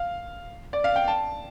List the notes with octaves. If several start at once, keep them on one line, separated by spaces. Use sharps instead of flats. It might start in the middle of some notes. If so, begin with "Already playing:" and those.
Already playing: F5
D5
F5
G5
A5